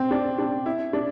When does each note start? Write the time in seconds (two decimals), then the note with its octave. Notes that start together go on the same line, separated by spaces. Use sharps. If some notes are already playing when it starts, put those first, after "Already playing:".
Already playing: C4
0.11 D4
0.39 D4
0.66 E4
0.93 D4